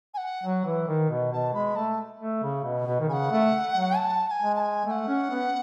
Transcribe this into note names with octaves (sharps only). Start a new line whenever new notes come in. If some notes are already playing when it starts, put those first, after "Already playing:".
G#5
F#5
F#3
E3
D#3
B2
B2 A5
G#3 B5
A3 A5
A3
C#3
B2
B2
D#3
C#3 F#5 G#5
A3
F#3
A5
A5
G#5
G#3
A5
G#5
A3 G#5
F#5
C#4
B3